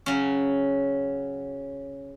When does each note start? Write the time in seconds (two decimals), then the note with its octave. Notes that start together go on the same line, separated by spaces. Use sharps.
0.06 C#3 F#3 C#4